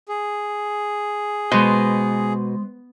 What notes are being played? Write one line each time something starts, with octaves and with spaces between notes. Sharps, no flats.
G#4
B2 G#3 B4 C5